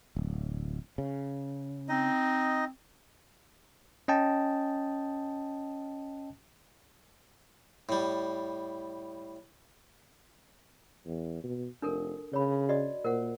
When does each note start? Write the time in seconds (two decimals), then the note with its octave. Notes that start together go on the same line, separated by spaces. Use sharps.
0.16 D1
0.98 C#3
1.89 C4 D#4 D#5
4.08 C#4 D#5 G5 A5
7.89 A2 G3
11.06 E2
11.44 B2
11.82 F1 D4 A4 A#4
12.33 C#3 C#5 B5
12.69 F#4 D5 D#5
13.04 A#2 A#4 C5 F#5